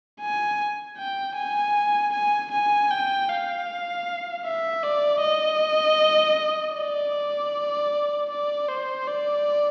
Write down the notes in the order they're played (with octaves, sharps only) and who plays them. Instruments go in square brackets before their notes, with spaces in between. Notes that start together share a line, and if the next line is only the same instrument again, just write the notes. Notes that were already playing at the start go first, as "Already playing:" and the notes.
[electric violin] G#5
G5
G#5
G#5
G#5
G5
F5
E5
D5
D#5
D5
D5
C5
D5